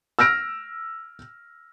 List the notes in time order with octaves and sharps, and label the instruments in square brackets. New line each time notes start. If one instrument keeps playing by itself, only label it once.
[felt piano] E6 F6 A#6 D7